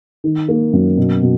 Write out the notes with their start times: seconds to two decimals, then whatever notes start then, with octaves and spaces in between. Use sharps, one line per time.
0.24 D#3
0.49 A#3
0.73 F#2
0.98 B2
1.22 B2